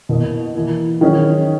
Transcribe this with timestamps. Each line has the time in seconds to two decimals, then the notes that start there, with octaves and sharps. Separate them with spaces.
0.09 B2 A#3 E4 A#4 D#5
0.55 E3 A#3 E4
1.01 D#3 F#3 C#4 G#4 D#5